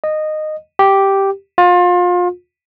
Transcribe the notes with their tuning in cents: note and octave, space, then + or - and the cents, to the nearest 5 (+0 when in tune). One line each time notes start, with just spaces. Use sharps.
D#5 -15
G4 -5
F4 +30